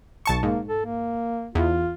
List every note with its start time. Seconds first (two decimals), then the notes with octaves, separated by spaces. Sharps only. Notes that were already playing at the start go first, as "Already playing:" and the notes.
0.26 B1 A5 C#6
0.43 G#2 A#3
0.68 A4
0.85 A#3
1.55 E2 F4